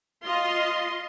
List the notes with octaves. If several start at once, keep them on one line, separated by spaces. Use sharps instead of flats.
F4 D#5 C6